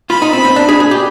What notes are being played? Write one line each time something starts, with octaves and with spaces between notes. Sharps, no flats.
F4 B5
D#4
C4
C4
D4
G#4
G#4
G4